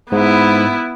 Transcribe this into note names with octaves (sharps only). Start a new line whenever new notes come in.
G#2 B3 E4